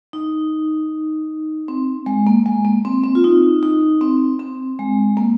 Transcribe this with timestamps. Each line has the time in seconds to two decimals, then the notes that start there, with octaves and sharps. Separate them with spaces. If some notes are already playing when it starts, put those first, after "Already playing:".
0.13 D#4
1.68 C4
2.06 G#3
2.27 A#3
2.46 G#3
2.65 A#3
2.85 C4
3.04 C4
3.15 F4
3.24 D#4
3.63 D#4
4.01 C4
4.39 C4
4.79 G#3
5.17 A#3